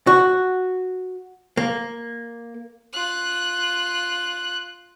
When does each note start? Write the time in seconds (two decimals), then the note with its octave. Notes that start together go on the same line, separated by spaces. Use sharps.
0.07 F#4
1.57 A#3
2.92 F4 F#6